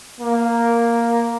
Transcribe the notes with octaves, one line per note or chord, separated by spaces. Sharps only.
A#3